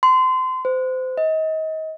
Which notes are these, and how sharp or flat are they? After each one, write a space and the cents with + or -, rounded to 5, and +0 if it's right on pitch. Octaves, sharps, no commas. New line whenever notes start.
C6 -30
C5 -30
D#5 +30